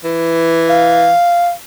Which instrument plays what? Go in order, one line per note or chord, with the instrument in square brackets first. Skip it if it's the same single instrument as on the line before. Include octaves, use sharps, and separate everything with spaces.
[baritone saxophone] E3
[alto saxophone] F5